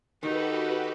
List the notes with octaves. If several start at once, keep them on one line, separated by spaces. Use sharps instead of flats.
D#3 D#4 F#4 G4 A4 B4